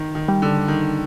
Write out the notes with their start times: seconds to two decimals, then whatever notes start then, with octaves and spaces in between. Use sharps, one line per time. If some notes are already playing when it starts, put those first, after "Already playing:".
Already playing: D#3
0.15 D#3
0.28 G3
0.42 D3
0.68 D#3